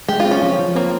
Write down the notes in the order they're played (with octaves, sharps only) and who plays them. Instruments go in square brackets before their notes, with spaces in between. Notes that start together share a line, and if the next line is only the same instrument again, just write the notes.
[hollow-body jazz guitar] G#3 [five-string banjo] G4
[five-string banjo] F4
[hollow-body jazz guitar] C4
[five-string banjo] C#4
[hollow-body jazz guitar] F3
F3
[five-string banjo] A#3 [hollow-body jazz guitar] C4